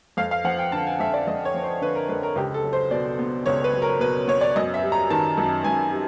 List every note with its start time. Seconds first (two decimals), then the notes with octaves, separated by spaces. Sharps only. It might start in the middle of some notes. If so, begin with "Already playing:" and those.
0.17 F2 F5
0.31 F5
0.44 F3 F#5
0.59 G5
0.72 D3 A5
0.87 G#5
1.00 F2 E5
1.14 D5
1.27 F2 D#5
1.45 C#5
1.54 F3
1.63 C5
1.81 D3 B4
1.95 A#4
2.09 F2 B4
2.23 A#4
2.36 C#2 G4
2.54 A4
2.64 F#3
2.73 C5
2.91 B2 D5
3.19 B3
3.46 C#2 C#5
3.64 B4
3.73 F#3
3.82 A#4
4.00 B2 B4
4.28 B3 C#5
4.41 D5
4.56 F#2 D#5
4.74 E5
4.83 G3
4.92 A#5
5.10 D#3 A5
5.37 F#2
5.64 F#2 G#5
5.92 G3